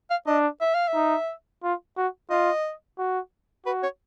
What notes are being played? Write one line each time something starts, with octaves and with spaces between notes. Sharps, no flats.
F5
D4 D#5
E5
F5
E5
D#4
F4
F#4
F4 D#5
F#4
F#4 B4
C#5